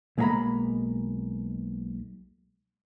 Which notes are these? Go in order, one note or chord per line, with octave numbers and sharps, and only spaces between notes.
B1 G#3 A#3 E5 A#5 B5